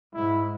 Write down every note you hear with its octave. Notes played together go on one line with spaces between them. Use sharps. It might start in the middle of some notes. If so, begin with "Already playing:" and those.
G#2 E4